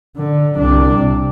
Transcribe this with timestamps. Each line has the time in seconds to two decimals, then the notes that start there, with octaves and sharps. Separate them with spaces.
0.17 D3
0.58 C2 D4
0.97 C3